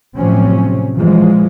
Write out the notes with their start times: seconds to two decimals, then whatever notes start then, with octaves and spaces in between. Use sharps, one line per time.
0.17 A2 C3 F3 F#3 C4 C#4
0.95 A#2 E3 F3 G#3